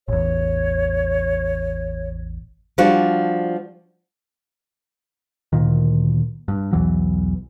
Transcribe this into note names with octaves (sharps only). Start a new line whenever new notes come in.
A1 E2 C#5
F3 G3 D4 F#4
D2 A#2 D#3
G2
B1 E2 E3 F#3